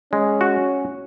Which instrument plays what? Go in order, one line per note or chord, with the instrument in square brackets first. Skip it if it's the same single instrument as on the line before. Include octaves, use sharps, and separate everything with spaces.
[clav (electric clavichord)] G#3 [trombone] C#4
[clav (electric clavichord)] F#4